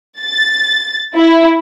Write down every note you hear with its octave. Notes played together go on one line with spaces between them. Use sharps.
A6
E4